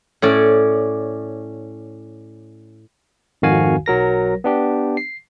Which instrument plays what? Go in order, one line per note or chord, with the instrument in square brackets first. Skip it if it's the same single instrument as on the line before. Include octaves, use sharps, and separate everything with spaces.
[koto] A2 C#4 D5
[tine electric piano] G#1 F2 D#3 F#4 F5 G#5
B1 F#3 A#4 A#6
B3 D4 G4
C7